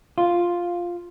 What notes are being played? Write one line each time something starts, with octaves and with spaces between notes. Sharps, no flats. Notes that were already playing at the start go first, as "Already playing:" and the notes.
F4